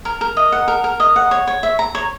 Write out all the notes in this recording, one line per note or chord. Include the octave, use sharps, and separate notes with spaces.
A#4
A#4
D#5
F#5
A#4
A#4
D#5
F#5
C#5
C#5
E5
A#5
C#5